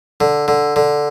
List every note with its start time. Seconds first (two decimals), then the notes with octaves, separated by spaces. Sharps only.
0.21 D3
0.48 D3
0.76 D3